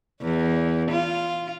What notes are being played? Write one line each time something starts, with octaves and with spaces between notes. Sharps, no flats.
E2
F4